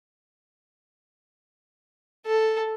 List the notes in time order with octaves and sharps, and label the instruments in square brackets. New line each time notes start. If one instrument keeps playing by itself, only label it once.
[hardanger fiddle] A4